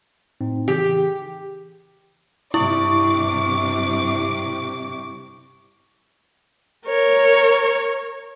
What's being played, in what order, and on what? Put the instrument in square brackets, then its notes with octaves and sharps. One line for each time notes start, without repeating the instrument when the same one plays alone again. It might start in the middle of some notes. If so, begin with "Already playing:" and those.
[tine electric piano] A2 C4 D#4
[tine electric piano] C#3 E3 G#4 [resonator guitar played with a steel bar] G4
[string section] G2 C3 D6 [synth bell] E4 [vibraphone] C#6
[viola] A#4 C#5